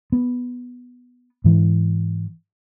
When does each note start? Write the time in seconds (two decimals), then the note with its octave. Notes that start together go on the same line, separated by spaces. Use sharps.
0.12 B3
1.44 G#2 E3